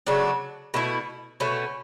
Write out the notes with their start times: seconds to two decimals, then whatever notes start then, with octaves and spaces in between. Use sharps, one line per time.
0.06 C#3 F#3 A3 D4
0.74 B2 A3 E4
1.40 B2 A3 C#4